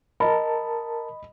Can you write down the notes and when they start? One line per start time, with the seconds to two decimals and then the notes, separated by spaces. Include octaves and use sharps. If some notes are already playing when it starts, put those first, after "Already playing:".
0.20 A#4 D#5 A5 B5